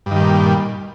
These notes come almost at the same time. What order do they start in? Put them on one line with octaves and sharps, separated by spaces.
G2 D#3 G3 A#2